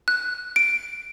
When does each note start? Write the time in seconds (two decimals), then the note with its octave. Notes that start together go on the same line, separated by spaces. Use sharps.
0.08 F#6
0.56 D7